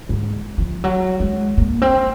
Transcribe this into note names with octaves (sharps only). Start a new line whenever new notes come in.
G#2
F3
F#3
G#3
A#3
C4